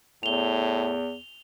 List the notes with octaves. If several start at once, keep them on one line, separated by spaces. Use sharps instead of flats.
E2 A2 F7 G7